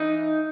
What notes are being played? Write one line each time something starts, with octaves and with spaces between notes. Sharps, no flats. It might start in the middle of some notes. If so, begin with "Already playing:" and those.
Already playing: E3 D#4